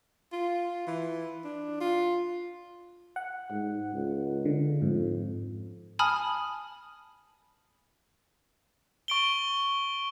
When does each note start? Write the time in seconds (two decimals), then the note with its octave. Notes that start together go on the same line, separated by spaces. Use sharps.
0.32 F4
0.87 E3
1.44 D4
1.81 F4
3.16 F#5
3.50 G#2
3.95 C#2
4.45 D3
4.82 F2 G#2
5.99 G#5 A5 B5 D#6 F6
9.08 C#6 D7 G7